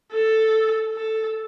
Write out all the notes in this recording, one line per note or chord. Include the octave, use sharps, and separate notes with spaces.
A4
A4